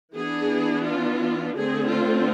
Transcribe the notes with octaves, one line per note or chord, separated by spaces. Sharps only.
E3 B3 D4 G#4
F4
D3 A3 C4 G#4
F4